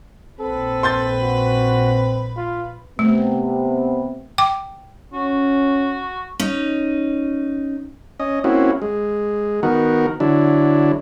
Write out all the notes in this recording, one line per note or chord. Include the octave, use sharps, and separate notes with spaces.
A#1 C4 A4 B4
C6 G6 A6
F#4
F4
C3 A3 B3
G5 D6
C#4 F#4
C#4 D#4
C#4 D#5
A#3 C4 C#4 E4 F#4
G#3
D#3 B3 F#4 A#4
D3 F#3 D4 E4